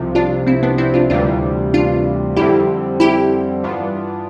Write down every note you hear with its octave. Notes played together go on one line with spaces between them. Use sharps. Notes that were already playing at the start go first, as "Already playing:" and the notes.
Already playing: C2 C3 F3
D4 F4
C4 E4
B3 D4
C4 E4
D4 F4
D2 C3 E3 G3 D4 F4
D4 F4
F2 D3 G3 C4 E4 G4
E4 G4
G2 E3 B3 D4 F4